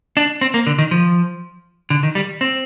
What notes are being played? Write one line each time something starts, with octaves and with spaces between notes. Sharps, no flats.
D4
C4
A#3
D3
D#3
F3
D3
D#3
G3
C4